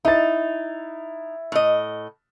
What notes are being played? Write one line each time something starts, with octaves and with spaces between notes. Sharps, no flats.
D#4 E4 A6
A2 D#5